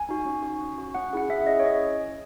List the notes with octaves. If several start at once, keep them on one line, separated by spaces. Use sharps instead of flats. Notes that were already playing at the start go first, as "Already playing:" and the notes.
Already playing: G#5
D#4 F#4
C#4
F#4
C#4
F#4
C#4 F#5
E4 G#4 F#5
C#4 E5
E4 G#4 D#5
C#5
C#4 D#5